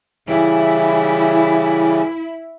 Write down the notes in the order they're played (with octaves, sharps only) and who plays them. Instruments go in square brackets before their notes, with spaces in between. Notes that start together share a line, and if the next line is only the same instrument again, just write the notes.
[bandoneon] C#3 E3 G3 [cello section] E4